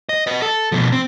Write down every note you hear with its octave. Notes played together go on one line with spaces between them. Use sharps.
D#5
B4 D#5
A4
B2 F3
C4